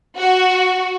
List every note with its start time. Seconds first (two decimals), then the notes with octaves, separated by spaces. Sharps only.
0.17 F#4